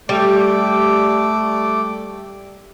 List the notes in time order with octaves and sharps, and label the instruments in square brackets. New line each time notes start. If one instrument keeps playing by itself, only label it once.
[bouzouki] G3 [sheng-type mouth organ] A3 D6